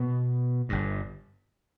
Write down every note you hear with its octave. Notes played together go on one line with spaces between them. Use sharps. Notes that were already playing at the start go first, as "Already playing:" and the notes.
Already playing: B2 B3
G1 G2